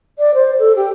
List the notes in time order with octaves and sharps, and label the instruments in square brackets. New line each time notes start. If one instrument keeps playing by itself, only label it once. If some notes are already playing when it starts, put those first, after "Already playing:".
[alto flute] D5
C5
A4
G4